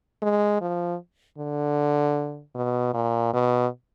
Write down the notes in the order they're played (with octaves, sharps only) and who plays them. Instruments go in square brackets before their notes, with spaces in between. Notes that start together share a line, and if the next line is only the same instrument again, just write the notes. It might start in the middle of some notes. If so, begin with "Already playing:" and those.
[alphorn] G#3
F3
D3
B2
A#2
B2